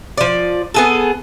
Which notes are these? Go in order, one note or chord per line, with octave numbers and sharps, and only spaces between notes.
F3 D5
B3 G#4 A4